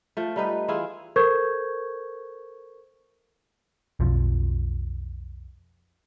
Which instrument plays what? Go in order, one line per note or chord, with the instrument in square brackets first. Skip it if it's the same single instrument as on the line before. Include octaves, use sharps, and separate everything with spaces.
[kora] F3 A3
G3 D#4 B4
E3 E4 F4 G#4
[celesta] A4 A#4 C5 C#6 G6 G#6
[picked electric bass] B1 F2 F3